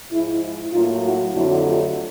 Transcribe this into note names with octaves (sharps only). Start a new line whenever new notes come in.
G#2 F3 G#3 E4
E4
A2 F#3 A#3 D#4 F4
E4 F#4
F2 D3 F#3 A3 E4 F#4
F4 G4